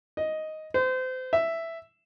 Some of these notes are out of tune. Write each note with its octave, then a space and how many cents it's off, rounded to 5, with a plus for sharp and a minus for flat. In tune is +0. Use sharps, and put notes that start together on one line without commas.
D#5 +5
C5 -30
E5 +5